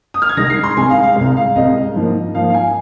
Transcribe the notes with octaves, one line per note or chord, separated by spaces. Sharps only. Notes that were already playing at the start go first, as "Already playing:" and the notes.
D#6
F6
G#6
C2 C3 D#3 G#3 A#6
C7
C6
C2 C3 D#3 G#3 G#5
F5
F5
C2 C3 G#3 F5
F5
C2 C3 G#3 D#5
G#2 F3 A#3
G#2 F3 A#3 F5
F5
G#5